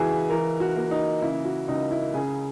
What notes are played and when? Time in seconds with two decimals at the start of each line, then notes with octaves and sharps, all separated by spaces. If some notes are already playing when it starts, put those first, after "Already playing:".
Already playing: C#2 E3 E4 F#4 G#4
0.30 E3 A#4
0.60 F#4
0.76 A#3
0.91 D#4
1.22 C#3 E4
1.45 F#4
1.68 C#2 D#4
1.91 E4
2.14 C#3 G#4